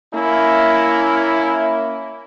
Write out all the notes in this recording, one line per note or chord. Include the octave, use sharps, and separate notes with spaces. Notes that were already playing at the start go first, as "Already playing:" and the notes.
A#3 C#4 E4